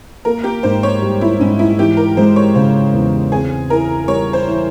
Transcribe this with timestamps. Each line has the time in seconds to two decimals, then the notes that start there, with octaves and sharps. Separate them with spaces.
0.25 A#3 A#4
0.44 G4
0.63 G#2 C5
0.83 C#5
1.02 G3
1.21 E4
1.40 G#2 C#4
1.59 E4
1.79 E3 G4
1.97 A#4
2.17 G#3 C5
2.36 C#5
2.55 C#3 C5
2.93 E2
3.32 C4 G#4
3.70 E3 A#4
4.08 G3 C#5
4.33 C5
4.47 E3